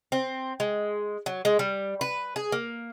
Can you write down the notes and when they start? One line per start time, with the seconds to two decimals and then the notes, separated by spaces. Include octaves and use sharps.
0.12 C4
0.60 G#3
1.26 F#3
1.45 G#3
1.59 G3
2.01 B4
2.36 G#4
2.52 A#3